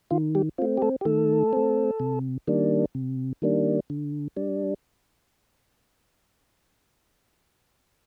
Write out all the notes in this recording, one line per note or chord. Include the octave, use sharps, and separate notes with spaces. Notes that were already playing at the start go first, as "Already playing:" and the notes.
D#3 F4
G3 G4
A3 C4 F4
G4
A3 A4
G4
D#3 A3 A4
A3 C4
C3
D#3 G3 A#3 D4
C3
D#3 G3 A#3 D4
D3
G3 D4